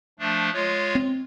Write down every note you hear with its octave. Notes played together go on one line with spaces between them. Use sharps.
F3 A3 D4
G#3 F4 C#5
C4